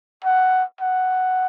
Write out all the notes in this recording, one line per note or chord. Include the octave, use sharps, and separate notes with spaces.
F#5
F#5